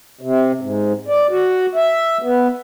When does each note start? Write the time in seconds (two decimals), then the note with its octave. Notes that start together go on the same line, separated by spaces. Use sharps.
0.21 C3
0.61 G#2
1.08 D5
1.30 F#4
1.75 E5
2.22 B3